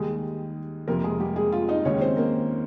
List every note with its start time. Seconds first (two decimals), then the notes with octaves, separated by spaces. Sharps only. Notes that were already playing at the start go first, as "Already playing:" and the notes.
Already playing: D#2 D#3 G3 G#3 G#4
0.87 F2 C3 F3 A#3 A#4
1.04 G#3 G#4
1.20 G3 G4
1.36 G#3 G#4
1.52 F4
1.69 D#4 D#5
1.85 D#2 D#3 G#3 C#4 C#5
2.01 C4 C5
2.17 A#3 A#4